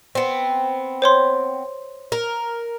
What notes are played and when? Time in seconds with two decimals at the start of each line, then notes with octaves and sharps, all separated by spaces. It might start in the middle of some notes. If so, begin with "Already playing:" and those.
0.15 B3 C4
1.02 C5 C#5 C6
2.12 A#4